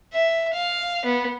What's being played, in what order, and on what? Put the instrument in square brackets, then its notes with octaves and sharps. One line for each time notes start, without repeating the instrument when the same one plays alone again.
[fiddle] E5
F5
B3